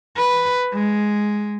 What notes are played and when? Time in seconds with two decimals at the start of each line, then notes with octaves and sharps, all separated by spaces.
0.17 B4
0.73 G#3